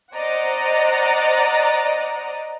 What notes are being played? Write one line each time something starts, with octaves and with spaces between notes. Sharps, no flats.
C5 D5 D#5 F#5 A#5